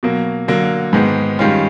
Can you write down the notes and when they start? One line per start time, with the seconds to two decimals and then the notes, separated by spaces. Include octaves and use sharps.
0.03 B2 F#3 A#3
0.48 D3 F#3 A#3
0.93 G#2 D#3 G#3 B3
1.39 G2 D#3 G#3 C#4 F4